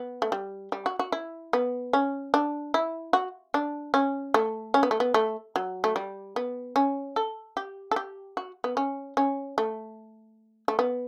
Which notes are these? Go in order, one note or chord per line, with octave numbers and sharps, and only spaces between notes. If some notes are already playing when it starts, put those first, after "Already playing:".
Already playing: B3
A3
G3
G3
F#4
F#4
E4
B3
C#4
D4
E4
F#4
D4
C#4
A3
C#4
B3
A3
B3
A3
F#3
A3
G3
B3
C#4
A4
G4
A4
G4
F#4
B3
C#4
C#4
A3
A3
B3